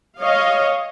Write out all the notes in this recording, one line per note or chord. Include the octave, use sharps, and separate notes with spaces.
C#5 D#5 F5